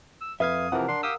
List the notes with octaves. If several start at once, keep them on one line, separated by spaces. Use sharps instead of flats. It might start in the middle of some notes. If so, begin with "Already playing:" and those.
E6
F2 B4 E5 F5 D#6 G#6
C3 E3 F3 A#4 F#5
D4 C6
G4 F5 D#6 E6